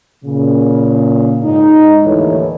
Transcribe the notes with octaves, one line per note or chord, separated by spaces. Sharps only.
A#2 C#3
G#2 D#4
D#2 A2 D3 E3 E4 C#5